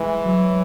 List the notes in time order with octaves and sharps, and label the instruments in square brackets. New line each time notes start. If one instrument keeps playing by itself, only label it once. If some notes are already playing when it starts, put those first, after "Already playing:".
Already playing: [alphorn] E3 [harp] G#3
[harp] F#3